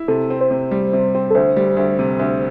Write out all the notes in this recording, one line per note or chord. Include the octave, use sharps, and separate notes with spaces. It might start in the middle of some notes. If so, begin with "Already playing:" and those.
Already playing: E4
C3 A4
C4
C5
C3
G3
C3
C4
A4
D2 C5
G3
D2
C3
D2